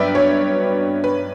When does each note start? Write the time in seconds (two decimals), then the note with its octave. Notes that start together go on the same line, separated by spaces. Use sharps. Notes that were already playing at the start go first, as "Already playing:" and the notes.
Already playing: G2 F#3 B3 B4 D5 E5 G5
0.15 C#5
1.04 B4